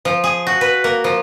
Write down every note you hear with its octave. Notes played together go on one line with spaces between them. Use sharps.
F3
G#4
F#4
B4
A#3
F3